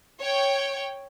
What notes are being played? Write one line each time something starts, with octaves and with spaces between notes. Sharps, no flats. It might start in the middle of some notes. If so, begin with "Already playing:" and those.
C#5 G5